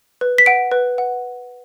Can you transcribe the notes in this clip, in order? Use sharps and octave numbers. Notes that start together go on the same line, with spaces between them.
B4
B6
F#5 D7
B4
F#5